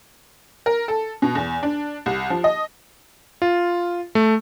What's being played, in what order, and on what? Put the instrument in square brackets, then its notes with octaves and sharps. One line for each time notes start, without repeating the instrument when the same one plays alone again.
[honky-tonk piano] A#4
A4
B2
E2
D4
C2
F3
D#5
[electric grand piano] F4
A3